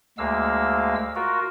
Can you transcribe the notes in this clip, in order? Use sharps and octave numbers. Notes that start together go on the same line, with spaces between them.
D2 G#3 A#3 F5 E6
F4 F#4 A#4